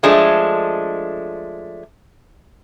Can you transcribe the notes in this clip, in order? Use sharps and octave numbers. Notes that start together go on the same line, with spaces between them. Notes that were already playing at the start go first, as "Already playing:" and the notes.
F3 G#3 A3 D4